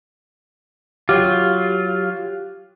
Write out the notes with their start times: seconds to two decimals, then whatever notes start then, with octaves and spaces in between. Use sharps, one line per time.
1.09 F#3 F4 G4